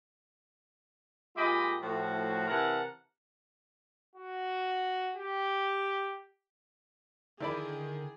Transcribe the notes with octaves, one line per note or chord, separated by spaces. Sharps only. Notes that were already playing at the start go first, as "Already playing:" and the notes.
A#2 G#3 F4 G4 D#5 B5
A2 F3 F#4
C3 E3 E4 A#4 F#5 A5
F#4
G4
D3 D#3 E4 G#4 D5 B5